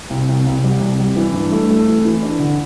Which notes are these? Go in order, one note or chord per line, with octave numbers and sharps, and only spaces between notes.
C2
C2
C2
G3
C2
G3
E3
G2
A3
A3
E3
E3
D4
D3